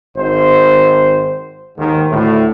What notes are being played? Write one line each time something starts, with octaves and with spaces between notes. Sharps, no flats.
G#1 C5
D#2 G#2 D#3
D2 A2